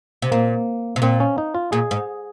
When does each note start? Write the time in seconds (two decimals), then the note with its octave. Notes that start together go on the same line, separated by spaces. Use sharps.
0.22 C3
0.32 A#2 A#3
0.96 C3
1.02 A#2 C4
1.20 C#4
1.38 D#4
1.55 F4
1.72 A#2 G#4
1.91 G#2